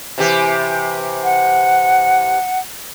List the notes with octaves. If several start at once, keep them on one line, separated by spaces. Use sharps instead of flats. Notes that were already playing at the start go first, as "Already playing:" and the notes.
C3 E3 G4
F#5